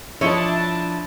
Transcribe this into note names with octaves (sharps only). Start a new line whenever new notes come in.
F3 D4 E4 C#5 D#5 A5